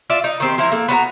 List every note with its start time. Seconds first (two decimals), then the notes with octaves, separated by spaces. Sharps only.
0.10 F4 D5 E5
0.24 D#4
0.40 D#3 C4 G4
0.58 F3 E4 A#5
0.72 A#3 A4
0.88 B3 D4 F#4 A#5